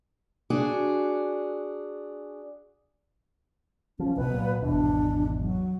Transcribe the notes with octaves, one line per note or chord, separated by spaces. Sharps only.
D4 F#4 G#4
F3 C#4
C2 B2 B4
A#2 F#3
G#1 E2 B2 D4
F#3